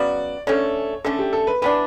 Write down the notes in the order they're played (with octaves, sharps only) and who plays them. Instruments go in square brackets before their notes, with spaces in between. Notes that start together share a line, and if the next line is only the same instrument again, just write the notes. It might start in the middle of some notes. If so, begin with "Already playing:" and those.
Already playing: [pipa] C#3 F#3 B3 F#4 [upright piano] D5
[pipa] D3 A3 C#4 [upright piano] C#5
[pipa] D3 A3 C#4 [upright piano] A4
[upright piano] G4
A4
B4
[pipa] E3 B3 D4 [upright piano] B4